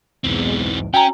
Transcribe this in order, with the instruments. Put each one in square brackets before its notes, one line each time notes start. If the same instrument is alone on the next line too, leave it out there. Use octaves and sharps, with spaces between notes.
[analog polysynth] B1 E2 G#2 [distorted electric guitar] E3 C4
[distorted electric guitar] C#4 [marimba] F#4 G#5 A#5 [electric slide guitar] G5